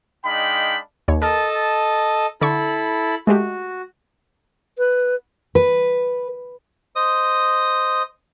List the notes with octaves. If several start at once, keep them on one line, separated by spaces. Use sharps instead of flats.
G#3 D4 D#4 F5 G5 B5
D#2 C#5
A4 A#4 D#5 A5
D3 E4 A4 D5 B5 C#6
G#3 A3 F#4 G4
B4
B4
C5 D#5 D#6